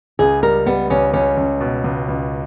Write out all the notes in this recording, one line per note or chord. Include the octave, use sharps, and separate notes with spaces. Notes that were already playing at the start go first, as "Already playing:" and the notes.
C#2 G#4
G3 A#4
G3 B3
C#2 C#4
C#2 C#4
C#2
B2
C#2
C#2